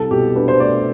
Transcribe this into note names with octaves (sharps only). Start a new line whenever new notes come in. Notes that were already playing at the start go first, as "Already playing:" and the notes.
Already playing: C2 A4
B2 G4
D4 B4
C5
A3 D5